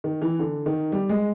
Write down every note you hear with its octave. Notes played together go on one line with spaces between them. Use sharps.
D#3
E3
D3
D#3
G3
G#3